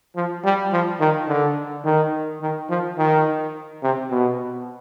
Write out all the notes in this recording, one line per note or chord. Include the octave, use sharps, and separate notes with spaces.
F3
G3
F3
D#3
D3
D#3
D#3
F3
D#3
C3
B2